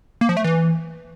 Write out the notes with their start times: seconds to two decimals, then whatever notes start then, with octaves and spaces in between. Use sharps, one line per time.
0.21 A#3
0.29 F3
0.37 A3
0.44 E3